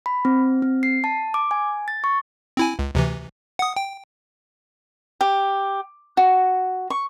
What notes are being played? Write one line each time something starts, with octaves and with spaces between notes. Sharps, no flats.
B5
C4
C4
C7
A5
D6
G#5
A6
C#6
C4 E4 G#5
C#2
D2 C3 E3
F#5 D#6
G5
G4
F#4
C#6